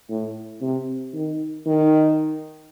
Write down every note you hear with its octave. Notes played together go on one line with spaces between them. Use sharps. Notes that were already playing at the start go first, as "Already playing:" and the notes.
A2
C3
D#3
D#3